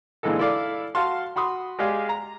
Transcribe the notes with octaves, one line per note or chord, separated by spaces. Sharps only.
A#2 D3 E3 G#3 D#4 A4
E4 A4 D5 F5
F#4 F5 A5 C6
F#4 B5 C6 D#6
G#3 G4 G#4 D5 F5
A#5